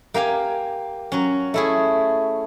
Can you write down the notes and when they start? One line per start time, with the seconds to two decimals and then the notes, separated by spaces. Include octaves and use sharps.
0.14 A#3 G4 F5 G#5
1.12 F#3 C#4
1.54 A3 E4 G#4